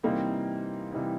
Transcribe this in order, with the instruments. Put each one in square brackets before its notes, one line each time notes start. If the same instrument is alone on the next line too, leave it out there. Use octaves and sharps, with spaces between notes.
[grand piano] C3 E3 G3 C4 D#4 [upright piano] A#3
[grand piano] C3 E3 G3 C4 D#4